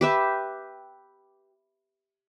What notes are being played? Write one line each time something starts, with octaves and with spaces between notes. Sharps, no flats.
G4 B4 E5